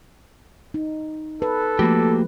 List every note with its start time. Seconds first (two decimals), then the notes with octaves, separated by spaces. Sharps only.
0.74 D#4
1.42 A4 B4
1.79 F3 A3 A#3 F#4 G4